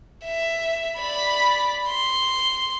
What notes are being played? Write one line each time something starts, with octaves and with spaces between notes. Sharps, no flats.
E5
D5 B5
C6